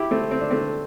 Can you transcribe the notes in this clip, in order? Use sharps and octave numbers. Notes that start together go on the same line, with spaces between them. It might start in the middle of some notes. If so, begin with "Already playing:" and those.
Already playing: E4 G4
A3 C4
C4
D4
A3 C4